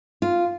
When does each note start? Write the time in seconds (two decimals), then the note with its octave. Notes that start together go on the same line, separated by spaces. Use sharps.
0.22 F4